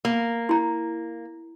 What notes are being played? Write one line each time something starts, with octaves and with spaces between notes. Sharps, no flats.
A#3
E4 A#5